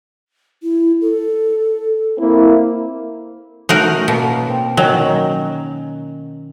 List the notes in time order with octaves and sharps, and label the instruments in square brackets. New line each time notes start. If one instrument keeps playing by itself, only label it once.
[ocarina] E4
A4
[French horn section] A#3 C4 E4
[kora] A3 C#4 [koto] D#4 F#4 A#4
[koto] B2 [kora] A#3
[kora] C4
[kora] D#3 C#4 D#4 [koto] F#3